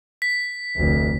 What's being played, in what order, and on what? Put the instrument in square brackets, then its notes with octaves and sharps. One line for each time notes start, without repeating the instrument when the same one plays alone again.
[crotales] B6
[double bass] F1 D2